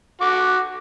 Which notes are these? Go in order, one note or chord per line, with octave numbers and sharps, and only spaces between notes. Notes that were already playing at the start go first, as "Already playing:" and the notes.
F#4 D6